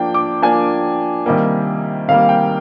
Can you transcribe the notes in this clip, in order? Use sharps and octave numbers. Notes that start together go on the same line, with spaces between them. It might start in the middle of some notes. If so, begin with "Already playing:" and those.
Already playing: F3 A#3 D4 G5
D6
F3 A#3 D4 G#5
C3 D#3 G3 A#3
C3 D#3 G3 A#3 F5
G5